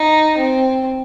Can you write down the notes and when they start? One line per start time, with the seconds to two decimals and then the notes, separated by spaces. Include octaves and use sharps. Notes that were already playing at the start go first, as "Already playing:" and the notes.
Already playing: D#4
0.38 C4